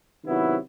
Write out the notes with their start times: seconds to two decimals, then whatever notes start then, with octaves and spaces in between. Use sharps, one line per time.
0.24 C3 D#3 F#3 B3 E4